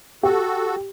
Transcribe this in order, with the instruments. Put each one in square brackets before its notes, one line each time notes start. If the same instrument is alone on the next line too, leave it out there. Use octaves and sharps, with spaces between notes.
[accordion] F#4 A4 [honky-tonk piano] G4